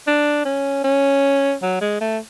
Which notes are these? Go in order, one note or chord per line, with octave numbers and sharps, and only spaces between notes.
D4
C#4
C#4
F#3
G#3
A3